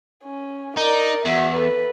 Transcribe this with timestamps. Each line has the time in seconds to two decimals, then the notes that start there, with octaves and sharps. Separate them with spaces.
0.24 C#4
0.77 D#4 A#4 D5
1.25 E2 F#4 E5
1.55 A4 B4